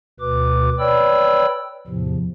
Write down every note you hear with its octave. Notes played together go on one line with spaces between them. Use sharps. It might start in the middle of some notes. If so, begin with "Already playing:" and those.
D2 B2 B4 D6
B4 C#5 D5 G5 B5 E6
E2 A2 C3 F3